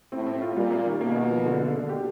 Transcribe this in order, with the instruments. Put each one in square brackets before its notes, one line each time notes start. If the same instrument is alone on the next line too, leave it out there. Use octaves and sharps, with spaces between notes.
[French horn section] A2 [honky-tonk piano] C4
[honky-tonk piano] C4
F4
[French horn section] A#2 [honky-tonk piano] G3
[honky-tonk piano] A#3
D#3
[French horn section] B2 [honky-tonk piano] A#3
[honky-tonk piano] A#3
F3
D3
D3
D3
G4